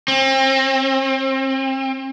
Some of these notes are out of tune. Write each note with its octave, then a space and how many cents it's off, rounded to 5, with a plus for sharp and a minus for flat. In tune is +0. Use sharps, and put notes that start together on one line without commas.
C4 +35